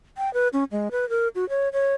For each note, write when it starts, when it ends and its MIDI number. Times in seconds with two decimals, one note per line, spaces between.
0.18 0.32 79
0.34 0.48 71
0.53 0.64 61
0.71 0.88 56
0.91 1.08 71
1.09 1.28 70
1.35 1.48 66
1.49 1.69 73
1.73 1.95 73